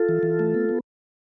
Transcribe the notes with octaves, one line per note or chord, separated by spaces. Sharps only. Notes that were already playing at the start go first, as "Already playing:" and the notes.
Already playing: F4 A4
E3
E3
A3
B3
B3